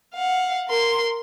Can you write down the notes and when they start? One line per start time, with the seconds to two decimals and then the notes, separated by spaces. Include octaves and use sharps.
0.14 F5 F#5
0.68 A#4 C6